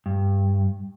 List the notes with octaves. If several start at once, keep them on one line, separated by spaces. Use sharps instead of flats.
G2